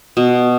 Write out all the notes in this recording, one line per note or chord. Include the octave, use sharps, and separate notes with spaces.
B2